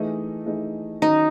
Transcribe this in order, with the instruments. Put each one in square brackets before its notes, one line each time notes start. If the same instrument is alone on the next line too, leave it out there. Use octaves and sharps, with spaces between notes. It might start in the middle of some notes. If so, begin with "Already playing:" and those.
Already playing: [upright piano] E3 A3 D#4 G#4 D#5
E3 A3 D#4 G#4 D#5
[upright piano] D#3 F#3 C#4 [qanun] D#4